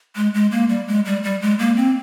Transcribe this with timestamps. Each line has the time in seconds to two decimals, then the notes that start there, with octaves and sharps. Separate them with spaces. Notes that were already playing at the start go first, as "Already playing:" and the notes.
0.16 G#3
0.34 G#3
0.52 A#3
0.69 G3
0.88 G#3
1.05 G3
1.24 G3
1.42 G#3
1.59 A#3
1.77 C4